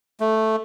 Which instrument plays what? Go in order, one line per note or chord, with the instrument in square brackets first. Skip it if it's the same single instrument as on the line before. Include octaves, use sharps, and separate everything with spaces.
[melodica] A3